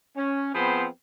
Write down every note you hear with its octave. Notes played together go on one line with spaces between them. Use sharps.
C#4
F3 B3 C4 G#4 C5 B5